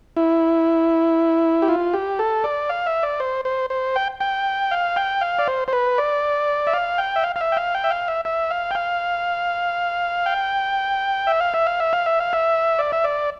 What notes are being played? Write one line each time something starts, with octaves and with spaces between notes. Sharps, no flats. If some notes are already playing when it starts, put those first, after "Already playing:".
E4
G4
F4
G4
A4
D5
F5
E5
D5
C5
C5
C5
G5
G5
F5
G5
F5
D5
C5
C5
B4
D5
E5
F5
G5
E5
F5
F5
E5
G5
F5
G5
E5
F5
E5
E5
F5
G5
F5
G5
E5
F5
E5
F5
E5
F5
E5
F5
E5
D5
E5
D5